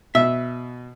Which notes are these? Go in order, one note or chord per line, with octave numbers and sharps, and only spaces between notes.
B2 E5